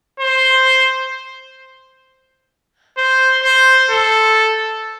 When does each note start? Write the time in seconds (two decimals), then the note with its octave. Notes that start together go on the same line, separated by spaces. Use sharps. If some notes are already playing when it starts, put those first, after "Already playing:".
0.20 C5
2.98 C5
3.44 C5
3.91 A4